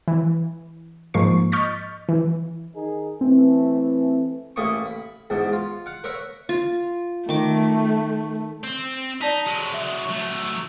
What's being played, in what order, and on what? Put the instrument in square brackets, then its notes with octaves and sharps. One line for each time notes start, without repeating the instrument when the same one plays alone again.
[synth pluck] E3
G#2 F3 A#3 C#6 C7
D#5 C#6 F6 G6 A6 B6
E3
[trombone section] D#3 D#4 G#4
[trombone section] E3 A3 [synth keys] C4
[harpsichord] A1 A2 A#3 D#5 G#5 C#6
B5
E2 G#2 B2
F4
F5 F#5
A#4 B4 C#5 E5 F#5
[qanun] F4
[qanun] D#3 D6 [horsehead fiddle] A3
[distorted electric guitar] C4
[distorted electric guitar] D#4 [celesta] D5 A5 B6
[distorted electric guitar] F#3 G#3
[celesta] E5
[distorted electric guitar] F#3 A3